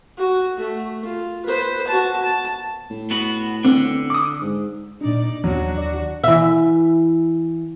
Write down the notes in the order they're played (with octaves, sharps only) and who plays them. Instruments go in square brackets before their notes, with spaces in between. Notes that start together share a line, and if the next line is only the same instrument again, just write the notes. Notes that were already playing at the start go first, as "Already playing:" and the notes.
[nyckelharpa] F#4
A3
F4
B4 C5
F#4 A5
A5
[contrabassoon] A2
[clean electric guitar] B3 F#4 B4
[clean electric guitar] D3 [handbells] B3 C4
[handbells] D6 D#6
[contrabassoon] G#2
[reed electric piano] A#2 D4 [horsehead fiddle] D#4 D5
[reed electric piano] D#2 [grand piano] F#3 [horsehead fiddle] D4 F#4
[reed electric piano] D#2 D5
[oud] E3 E5